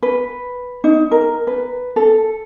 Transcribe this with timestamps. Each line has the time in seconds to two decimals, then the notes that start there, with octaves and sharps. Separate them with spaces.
0.03 B4
0.84 D#4
1.11 A#4
1.47 B4
1.96 A4